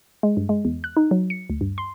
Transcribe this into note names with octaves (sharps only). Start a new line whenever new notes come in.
G#3
G2
G#3
E2
F#6
D#4
F#3
C#7
D2
G2
C6